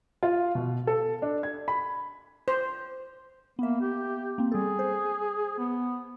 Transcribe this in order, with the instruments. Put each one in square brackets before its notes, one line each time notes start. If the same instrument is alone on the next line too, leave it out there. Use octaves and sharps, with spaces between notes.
[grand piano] F4
B2
A4
D4
G#6
B5
[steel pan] C5
[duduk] A#3 [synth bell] B3 E5
[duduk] G4
[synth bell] A#3 C4
[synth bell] G3 A4 [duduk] G#4
[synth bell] C5
[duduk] B3